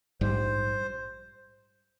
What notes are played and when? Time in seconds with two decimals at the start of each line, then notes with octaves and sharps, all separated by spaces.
0.21 A#1 G#2 G3 C5